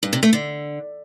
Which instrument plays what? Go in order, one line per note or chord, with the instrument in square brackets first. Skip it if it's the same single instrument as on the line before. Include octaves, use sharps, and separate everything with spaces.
[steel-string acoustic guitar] G2
C3
A3
D3